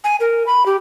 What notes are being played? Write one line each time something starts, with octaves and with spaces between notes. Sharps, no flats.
G#5
A#4
B5
G4